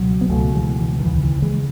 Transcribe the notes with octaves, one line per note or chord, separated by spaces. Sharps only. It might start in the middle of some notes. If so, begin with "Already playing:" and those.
Already playing: C#2 B2 F#3
B3
C#2 B2 F#3 A3
E3 G#3
E3
D#3
D#2 C#3 E3
E3
E3 G#3